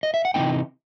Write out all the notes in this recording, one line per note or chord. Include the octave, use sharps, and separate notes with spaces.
D#5
E5
F#5
C3 E3 B3 D#4 G5